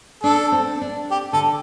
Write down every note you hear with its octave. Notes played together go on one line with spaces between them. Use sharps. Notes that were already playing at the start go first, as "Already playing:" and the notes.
D4 A4
C4
D4
G4
D3 A4